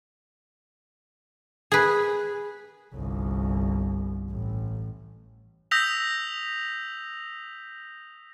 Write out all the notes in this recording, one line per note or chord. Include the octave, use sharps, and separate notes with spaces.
G#4 B4
G1 C2
A1
D#6 E6 G6 A#6 B6 F7